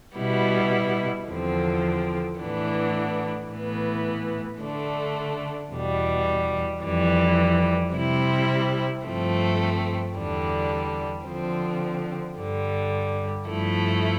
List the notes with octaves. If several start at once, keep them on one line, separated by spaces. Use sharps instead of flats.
B2 G3 B3 E4
E2 D3 F3 C4
A2 E3 B3 D4
A2 E3 B3
D3 A3 D4
E2 B2 G3
F2 E3 G3
C3 G3 C4 E4
G2 F3 A3 C4
E2 D3 G3 D4
D3 F3 C4
G2 D3 G3
G2 F3 A3 E4